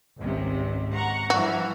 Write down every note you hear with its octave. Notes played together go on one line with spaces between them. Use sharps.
G#1 C#2 C3
F#5 A#5 C#6
G2 E3 F3 F#4